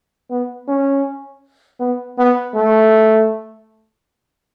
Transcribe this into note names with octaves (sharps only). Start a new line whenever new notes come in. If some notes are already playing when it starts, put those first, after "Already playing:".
B3
C#4
B3
B3
A3